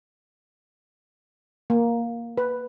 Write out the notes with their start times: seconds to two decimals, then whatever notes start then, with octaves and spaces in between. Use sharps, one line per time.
1.70 A#3
2.38 B4